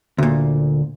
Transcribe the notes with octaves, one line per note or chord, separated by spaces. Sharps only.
D2 A#2